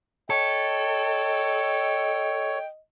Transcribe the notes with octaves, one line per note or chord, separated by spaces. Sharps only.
A4 C#5 D#5 G5